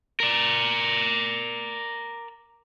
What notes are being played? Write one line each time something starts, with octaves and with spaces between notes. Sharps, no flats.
A#4 D5